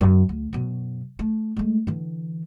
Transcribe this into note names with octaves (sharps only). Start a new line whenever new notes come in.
F#2 D3
D2
F#2 B2
A3
G#3 A3
D3 E3